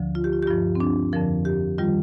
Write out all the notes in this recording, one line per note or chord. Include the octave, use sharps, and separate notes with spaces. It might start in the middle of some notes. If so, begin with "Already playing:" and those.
Already playing: D2 D3 F3
F4
G4
F4
G4
G2 F3 F4
C4
D4
F2 D3 F3 A#4
G4
D#3 G3 F4